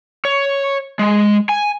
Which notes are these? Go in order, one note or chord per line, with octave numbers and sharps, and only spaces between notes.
C#5
G#3
G#5